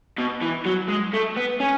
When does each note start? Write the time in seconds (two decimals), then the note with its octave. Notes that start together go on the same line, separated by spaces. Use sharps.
0.18 B2
0.41 E3
0.65 F#3
0.88 G#3
1.13 A3
1.37 B3
1.60 C#4